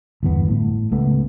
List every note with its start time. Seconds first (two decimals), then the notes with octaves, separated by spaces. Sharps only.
0.23 G1 E2 B3
0.49 A2
0.91 C#2 A3 B3